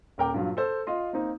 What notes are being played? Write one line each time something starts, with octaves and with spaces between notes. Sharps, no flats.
D#1 A#4 G5 D6
G2 A#2 F#3 F4
A4 C5 E6
F4 D#5 C6
A#3 C4 D#4